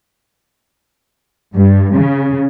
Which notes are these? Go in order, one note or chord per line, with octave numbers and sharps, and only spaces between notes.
G2
C#3